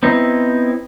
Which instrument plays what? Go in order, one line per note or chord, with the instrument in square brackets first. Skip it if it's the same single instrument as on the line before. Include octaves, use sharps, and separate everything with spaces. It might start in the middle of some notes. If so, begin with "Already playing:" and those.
[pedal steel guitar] B3 C4 D#4 E4